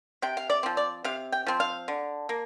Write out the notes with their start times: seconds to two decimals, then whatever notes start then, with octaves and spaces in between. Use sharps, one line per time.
0.22 C3 G5
0.37 F5
0.50 D5
0.63 F3 C4
0.77 D5
1.04 C3 F5
1.32 G5
1.47 F3 C4
1.60 F5
1.88 D3
2.29 A#3